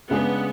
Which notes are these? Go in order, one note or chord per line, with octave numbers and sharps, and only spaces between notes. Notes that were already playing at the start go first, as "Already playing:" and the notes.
C#3 G#3 B3 D4 G#4